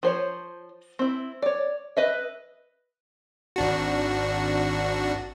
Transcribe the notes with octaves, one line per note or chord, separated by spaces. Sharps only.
F3 C5 C#5
C4 E4
C#5 D5
B4 D#5 E5
G#1 D4 F#4